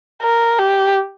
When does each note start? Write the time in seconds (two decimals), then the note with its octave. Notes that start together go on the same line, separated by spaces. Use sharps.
0.22 A#4
0.59 G4